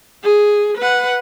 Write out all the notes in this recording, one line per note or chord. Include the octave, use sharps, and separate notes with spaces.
G#4
B4 F#5